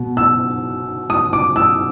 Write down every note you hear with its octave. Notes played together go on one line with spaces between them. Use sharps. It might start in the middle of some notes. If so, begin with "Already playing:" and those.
Already playing: B2 B3
E6
D#6
D6
E6